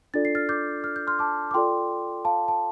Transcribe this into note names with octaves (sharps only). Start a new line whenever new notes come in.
D4 F4 A4 D5 A6
C7
F6 A6
D6 G6
F6
G6
C6 F6
A5 D6
D6
F4 A4 D5 G5 C6
F5 A5
A5